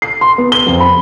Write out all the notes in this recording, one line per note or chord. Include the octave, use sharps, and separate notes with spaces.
C7
C6
B3
G7
F2
B5